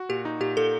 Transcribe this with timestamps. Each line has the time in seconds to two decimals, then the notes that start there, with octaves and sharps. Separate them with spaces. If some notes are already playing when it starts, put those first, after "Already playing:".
Already playing: F#4
0.09 A#2 G4
0.25 D#4
0.40 A#2 G4
0.57 A#2 A4